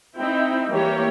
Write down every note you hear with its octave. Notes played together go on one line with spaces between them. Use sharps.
C4 D#4 E4 G5
E3 G3 A#3 G4 C#5